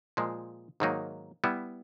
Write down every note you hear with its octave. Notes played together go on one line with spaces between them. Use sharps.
A#2 F3 G#3
G#2 D#3 F#3 A#3 D#4
G3 B3 E4